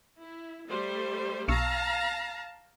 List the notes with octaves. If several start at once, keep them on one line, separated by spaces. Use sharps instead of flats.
E4
G3 A3 C5
B1 F5 A5 A#5 C#6 E6